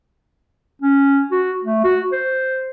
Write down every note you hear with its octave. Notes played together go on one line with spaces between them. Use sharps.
C#4
F#4
A3
F#4
C5